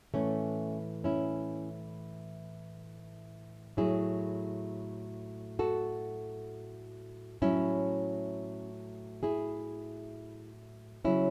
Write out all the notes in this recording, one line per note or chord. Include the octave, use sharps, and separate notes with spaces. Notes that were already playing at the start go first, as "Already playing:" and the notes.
A2 E3 A3 C#4
C#4 E4
A2 F#3 E4 G#4
F#4 A4
A2 F#3 C#4 E4
E4 G#4
C#3 F#3 C#4 E4